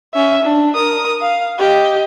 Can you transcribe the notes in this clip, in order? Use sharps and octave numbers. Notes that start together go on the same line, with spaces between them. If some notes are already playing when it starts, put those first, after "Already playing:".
C#4 E5
D4
A#4 D#6
F5
G4 D#5